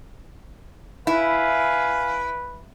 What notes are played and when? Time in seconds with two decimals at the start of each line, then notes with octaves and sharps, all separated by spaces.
1.07 E4 B4 F5 G#5